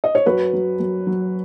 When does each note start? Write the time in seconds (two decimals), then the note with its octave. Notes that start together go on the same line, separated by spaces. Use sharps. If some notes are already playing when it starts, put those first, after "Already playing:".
0.04 D#5
0.15 C#5
0.26 F#2 F#4 B4
0.53 F#3
0.80 F#2
1.07 F#3